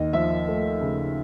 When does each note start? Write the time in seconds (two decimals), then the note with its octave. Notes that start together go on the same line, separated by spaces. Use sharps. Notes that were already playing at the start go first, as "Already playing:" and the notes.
Already playing: D#2 D#5
0.13 F3 E5
0.48 A3
0.81 C#3